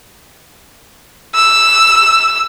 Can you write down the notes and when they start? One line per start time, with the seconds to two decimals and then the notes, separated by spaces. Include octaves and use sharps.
1.35 E6